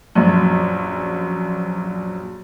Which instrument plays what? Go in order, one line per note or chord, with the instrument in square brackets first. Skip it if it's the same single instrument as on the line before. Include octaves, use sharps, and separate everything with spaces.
[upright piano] A#1 F#2